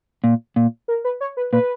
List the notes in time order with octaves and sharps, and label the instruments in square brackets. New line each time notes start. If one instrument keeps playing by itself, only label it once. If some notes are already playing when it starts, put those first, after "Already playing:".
[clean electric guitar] A#2
A#2
[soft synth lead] A#4
B4
C#5
B4
[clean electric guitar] A#2 [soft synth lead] B4